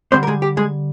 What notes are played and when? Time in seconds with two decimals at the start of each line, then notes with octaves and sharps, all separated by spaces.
0.12 D3 G3 C4 D4 C5
0.23 A#4
0.27 G#3 G#4
0.42 G4
0.57 G#3 G#4